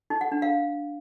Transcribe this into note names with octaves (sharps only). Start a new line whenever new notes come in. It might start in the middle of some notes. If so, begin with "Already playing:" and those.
D#4
F#5
D4
F5